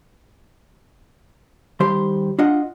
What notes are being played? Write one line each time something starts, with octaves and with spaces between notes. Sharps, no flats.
D#3 G3 G4 C5 C6
D4 F4 D#5 F#5